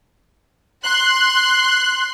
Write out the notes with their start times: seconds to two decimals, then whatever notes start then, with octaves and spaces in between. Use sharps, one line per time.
0.83 C6 F#6